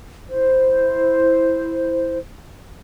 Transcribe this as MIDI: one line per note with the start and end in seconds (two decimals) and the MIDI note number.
0.29 2.18 64
0.29 2.18 72